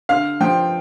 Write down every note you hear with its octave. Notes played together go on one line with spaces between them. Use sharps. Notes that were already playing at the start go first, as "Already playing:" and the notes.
D3 F5
F3 G5